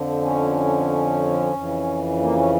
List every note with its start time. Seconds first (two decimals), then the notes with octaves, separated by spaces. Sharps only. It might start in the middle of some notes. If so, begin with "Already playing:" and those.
Already playing: F2 D3 F3
0.21 C#4
1.53 F2 C#3 E3
2.20 A#3
2.36 C#4